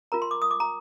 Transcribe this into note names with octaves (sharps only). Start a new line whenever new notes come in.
F4 A#4 A#5
C6
D6
D#6
D6
A#5